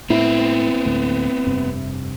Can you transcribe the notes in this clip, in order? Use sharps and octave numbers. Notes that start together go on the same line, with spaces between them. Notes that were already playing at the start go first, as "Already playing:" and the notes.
A2 B3 C4 E4
D2 A2
F1 G2 C3